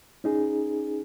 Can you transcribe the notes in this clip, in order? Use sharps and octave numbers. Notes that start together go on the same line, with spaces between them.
C#4 D#4 G#4